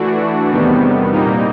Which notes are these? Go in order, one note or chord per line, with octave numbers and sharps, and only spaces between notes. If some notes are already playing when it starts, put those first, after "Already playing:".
Already playing: E3 A3 D4 F#4
E2 C3 D#3 G3 B3
A#2 G3 A#3 D#4